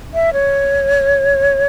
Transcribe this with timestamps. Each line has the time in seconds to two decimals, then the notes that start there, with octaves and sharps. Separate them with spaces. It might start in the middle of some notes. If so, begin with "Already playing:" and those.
0.14 E5
0.33 C#5